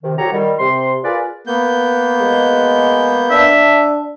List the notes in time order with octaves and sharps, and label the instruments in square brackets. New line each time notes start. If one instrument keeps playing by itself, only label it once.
[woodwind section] C3 D#3
C2 F#4 G4 A4 C#5 A#5
D#3 G3
C3 C6
F4 G#4 A#4 B4 D5
[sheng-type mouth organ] A#3 B3 G6
[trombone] G#3
[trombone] D4 [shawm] E5